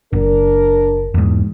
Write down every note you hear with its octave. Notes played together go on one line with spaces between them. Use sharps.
F#1 D4 A#4
E2 G#2